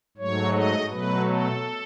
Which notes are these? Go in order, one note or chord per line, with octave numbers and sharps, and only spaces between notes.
G#2 F#3 A3 C#5
D#5
B2 F#3 A3 B4
A4